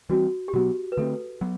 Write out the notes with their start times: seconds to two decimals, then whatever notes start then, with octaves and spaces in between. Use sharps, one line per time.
0.09 E3 G3 C4 F#4
0.48 G4
0.54 B2 F#3 B3 F#4
0.92 B4
0.97 D3 A3 C4 A4
1.41 F#3 B3